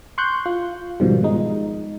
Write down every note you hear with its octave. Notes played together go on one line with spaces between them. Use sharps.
C6 C#6 F#6 G6
F4
G#2 B2 D#3 F3 G3
G#3 D#4